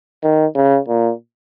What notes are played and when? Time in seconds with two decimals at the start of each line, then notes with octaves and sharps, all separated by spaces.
0.23 D#3
0.55 C#3
0.88 A#2